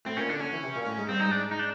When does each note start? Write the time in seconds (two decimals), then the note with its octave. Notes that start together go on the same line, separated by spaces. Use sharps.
0.05 A2 C4
0.17 A#2 C#4
0.28 D3 D4
0.40 D3 C#4
0.52 E3
0.63 C3
0.75 A#2
0.86 A2
0.97 G#2
1.09 G2 C4
1.20 D#4
1.25 G#2
1.31 D4
1.51 D#4
1.59 D4